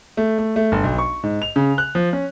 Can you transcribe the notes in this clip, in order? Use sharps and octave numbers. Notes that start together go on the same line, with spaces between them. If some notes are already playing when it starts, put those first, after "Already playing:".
A3
A3
A3
G1
B1
C#6
G#2
F7
C#3
F#6
F3
C#4